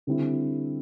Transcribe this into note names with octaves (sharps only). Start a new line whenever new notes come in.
D3 G3 C4 E4